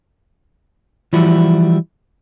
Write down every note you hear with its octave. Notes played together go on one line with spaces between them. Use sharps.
E3 F3 G3 E4 F#4